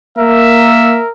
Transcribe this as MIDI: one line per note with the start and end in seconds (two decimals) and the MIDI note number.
0.18 0.99 58
0.18 1.11 70
0.18 1.08 76